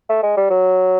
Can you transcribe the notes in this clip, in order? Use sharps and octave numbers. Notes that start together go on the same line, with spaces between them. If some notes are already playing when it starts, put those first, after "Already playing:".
A3
G#3
G3
F#3